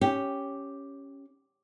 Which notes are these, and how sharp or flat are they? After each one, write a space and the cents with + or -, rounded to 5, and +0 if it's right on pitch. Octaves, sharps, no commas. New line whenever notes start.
C#4 +0 G4 +0